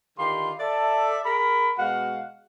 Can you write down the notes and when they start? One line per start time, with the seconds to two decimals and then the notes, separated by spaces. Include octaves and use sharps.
0.18 D3 D#3 F4 G4 B5 C6
0.59 A4 D5 E5
1.25 G#4 A#4 B5
1.78 B2 G#3 F#4 F5 F#5